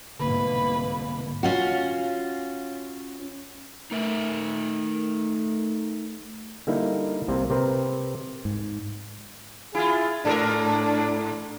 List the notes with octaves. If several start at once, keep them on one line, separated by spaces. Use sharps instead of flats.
C2 G#2 B2 D3 A#3 B4
C#4 F4 F#4
A3 D#4 A#4 E5
D3 G3 A#3 D#4 E4
C2 C3 A#3 C4
C3 C4 A#4 B4
G#2
E4 F4 G#4
G#2 D4 A4 A#4